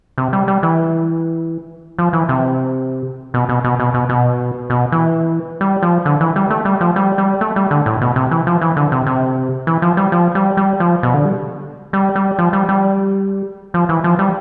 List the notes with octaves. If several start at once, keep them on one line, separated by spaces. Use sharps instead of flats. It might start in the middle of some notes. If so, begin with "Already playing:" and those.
C3
G3
G3
E3
F3
E3
C3
B2
B2
B2
B2
B2
B2
B2
E3
G3
F3
D3
E3
G3
A3
G3
F3
G3
G3
A3
G3
D3
A2
B2
C3
E3
F3
E3
D3
C3
C3
E3
F3
G3
F3
G3
G3
F3
B2
D3
G3
G3
G3
F3
G3
G3
F3
E3
F3
G3